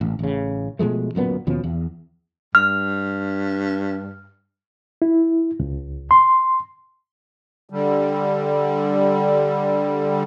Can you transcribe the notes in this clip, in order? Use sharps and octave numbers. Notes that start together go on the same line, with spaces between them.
A1
A1 C#3
B2 F3 G#3 A3
D1 F#2 A#2 B3
D#2 B2 F3 C#4
E2
G2 F6
E4
C#2
C6
D3 G3